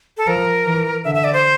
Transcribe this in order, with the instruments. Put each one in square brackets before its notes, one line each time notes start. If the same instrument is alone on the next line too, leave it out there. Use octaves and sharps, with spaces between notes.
[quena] A4
[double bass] F3 [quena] A#4
[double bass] E3
[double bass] D3 [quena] E5
[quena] E5
D5
C5